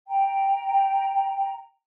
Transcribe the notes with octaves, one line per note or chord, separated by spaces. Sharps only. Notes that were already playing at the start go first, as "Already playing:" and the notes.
G5 A#5